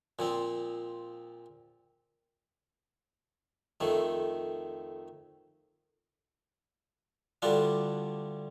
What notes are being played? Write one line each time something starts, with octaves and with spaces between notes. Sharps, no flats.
A#2 F3 C4
F2 D#3 A3
D2 D3 G3 D4 F4